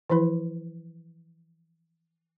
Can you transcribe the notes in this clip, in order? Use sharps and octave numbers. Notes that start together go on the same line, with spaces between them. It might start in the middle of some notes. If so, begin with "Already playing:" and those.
E3 F3 E4 B4